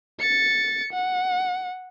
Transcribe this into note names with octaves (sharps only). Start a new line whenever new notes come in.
A6 C#7
F#5